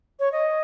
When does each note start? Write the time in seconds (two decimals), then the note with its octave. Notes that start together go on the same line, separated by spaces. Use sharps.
0.20 C#5
0.32 D#5